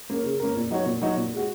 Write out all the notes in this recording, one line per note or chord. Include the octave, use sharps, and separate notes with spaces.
A#3 C#4 A#4
C#3
A#3 C#4 A#4
A#2
F#3 D#4 F#4 C#5
A#2
F#3 D#4 F#4 C#5
A#2
G#3 F#4